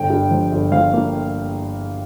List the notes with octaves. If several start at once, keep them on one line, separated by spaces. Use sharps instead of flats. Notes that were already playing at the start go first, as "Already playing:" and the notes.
Already playing: G1 G5
G2
F3
G1
F3 F5
A#3